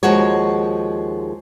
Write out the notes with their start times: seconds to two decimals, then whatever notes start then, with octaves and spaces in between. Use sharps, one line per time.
0.03 D#2 F3 G#3 F#4 C#5